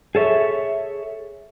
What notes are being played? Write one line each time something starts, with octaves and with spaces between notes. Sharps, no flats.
G#4 A4 C#5 E5